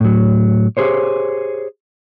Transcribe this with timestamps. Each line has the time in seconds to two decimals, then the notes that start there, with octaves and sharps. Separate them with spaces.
0.01 A2 F#3
0.77 G4 G#4 C5 C#5